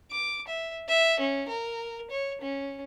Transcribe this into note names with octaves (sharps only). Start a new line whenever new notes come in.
D6
E5
E5
C#4
A#4
C#5
C#4